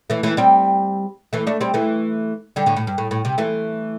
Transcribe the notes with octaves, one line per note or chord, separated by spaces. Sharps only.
E3 A3
E3 A3
G3 C4
E3 A3
A3 D4
G3 C4
E3 A3
D3 G3
A2 D3
A2
G2
A2
A2
C3
E3 A3